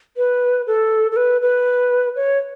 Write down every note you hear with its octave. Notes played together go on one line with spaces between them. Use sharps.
B4
A4
A4
B4
B4
C#5